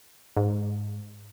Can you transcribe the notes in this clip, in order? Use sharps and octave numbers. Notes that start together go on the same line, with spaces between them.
G#2